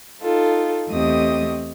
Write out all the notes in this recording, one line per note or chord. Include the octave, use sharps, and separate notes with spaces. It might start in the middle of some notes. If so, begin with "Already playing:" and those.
D#4 F4 A4
E2 A3 C4 G4 D#5 D#6